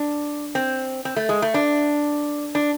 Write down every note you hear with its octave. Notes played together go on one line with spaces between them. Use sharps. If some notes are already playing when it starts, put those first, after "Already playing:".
Already playing: D4
C4
C4
A3
G#3
A3
D4
D4